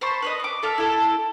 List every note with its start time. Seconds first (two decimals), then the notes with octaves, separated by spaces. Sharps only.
0.01 C5 A5 B5 C#6
0.22 B4 C#5 D#5
0.40 C#6 D6
0.63 A4 E5 F5
0.78 E4 A4